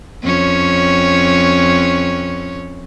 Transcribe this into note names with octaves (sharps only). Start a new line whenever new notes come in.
F2 C#4 C#5